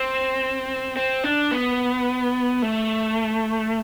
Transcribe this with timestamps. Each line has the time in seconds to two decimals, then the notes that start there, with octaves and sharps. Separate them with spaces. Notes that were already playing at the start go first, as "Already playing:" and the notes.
Already playing: C4
0.97 C4
1.24 D4
1.51 B3
2.62 A3